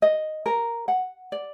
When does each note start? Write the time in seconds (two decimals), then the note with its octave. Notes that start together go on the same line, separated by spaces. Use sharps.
0.02 D#5
0.46 A#4
0.88 F#5
1.32 D5